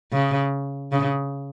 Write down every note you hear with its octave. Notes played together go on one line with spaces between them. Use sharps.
C#3
C#3